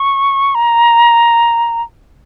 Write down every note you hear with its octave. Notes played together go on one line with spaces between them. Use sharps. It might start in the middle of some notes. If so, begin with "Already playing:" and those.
Already playing: C#6
A#5